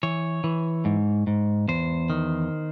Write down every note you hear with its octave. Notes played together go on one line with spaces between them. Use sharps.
E3 C#5
E3
G#2
G#2
E2 C5
D#3